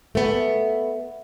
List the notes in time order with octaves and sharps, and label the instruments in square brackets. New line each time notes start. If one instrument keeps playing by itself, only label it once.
[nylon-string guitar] A3 B3